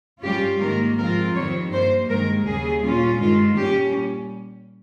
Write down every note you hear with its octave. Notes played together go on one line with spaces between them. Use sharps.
G2 G3 C#4 F4 G4
G#2 D#3 A#3 A#4
G#2 F3 C4 F4 A#4
F2 D#3 G3 C4 C#5
G2 G3 A#3 C5
G2 D#3 G#3 A#4
D#2 C#3 G3 G#4
A#2 G3 C#4 F4
G2 D#3 G#3 F4
A#2 G3 C#4 G4